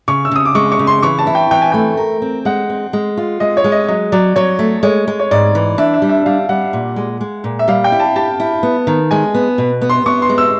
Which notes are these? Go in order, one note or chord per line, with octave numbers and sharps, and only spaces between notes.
C#3 C#6
E6
C#3 D#6
D6
G#3 C#6
C#6
C#3
C6
E3 C#6
A5
E4
G5
E3 G5
G#5
A3 G5
A#4
C4
G#3 F#5
C4
G#3
F4
G#3 D#5
C#5
G#3
D#5
F#3 D#5
F#3 D5
F#3 C#5
A3
G#3 C#5
G#3
C#5
G#2 D5
E3
D4 E5
E5
G3
E5
G3 F5
G3 F#5
A#2
G#3
G#3
A#2
E5
G3 F5
G5
E4
A5
G4 A5
E4
B3
D#3
G#3 G#5
B3
B2
B3
C6
B3 C#6
C6
G#3
E6